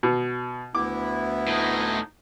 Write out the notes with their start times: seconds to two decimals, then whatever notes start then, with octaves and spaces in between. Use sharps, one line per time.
0.03 B2
0.75 D2 B3 E4 D6
1.47 A2 D#4